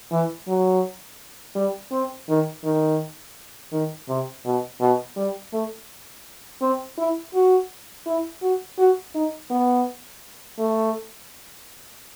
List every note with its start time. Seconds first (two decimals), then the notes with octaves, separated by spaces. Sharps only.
0.12 E3
0.48 F#3
1.55 G3
1.92 C4
2.29 D#3
2.64 D#3
3.72 D#3
4.08 C3
4.45 B2
4.80 B2
5.16 G3
5.53 A3
6.61 C4
6.98 E4
7.34 F#4
8.07 E4
8.42 F#4
8.78 F#4
9.15 D#4
9.51 B3
10.59 A3